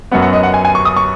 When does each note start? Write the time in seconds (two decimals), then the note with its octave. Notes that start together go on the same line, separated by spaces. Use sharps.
0.12 F#2 F#3 B3 F#5
0.22 F#5
0.33 D#5
0.43 F#5
0.54 G#5
0.65 G#5
0.75 C#6
0.85 D#6
0.96 C#6